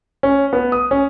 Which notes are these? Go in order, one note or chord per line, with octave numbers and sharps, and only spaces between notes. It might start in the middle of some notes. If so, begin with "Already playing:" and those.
C#4
B3
D#6
C#4